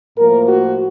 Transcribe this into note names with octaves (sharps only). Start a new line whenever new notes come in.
A2 F3 A#3 A#4
F#4